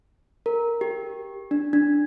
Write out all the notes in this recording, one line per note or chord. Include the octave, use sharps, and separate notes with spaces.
A#4
G4
D4
D4